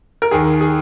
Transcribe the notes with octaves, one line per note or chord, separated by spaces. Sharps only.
A#4
D#2 D#3 G#4
G#4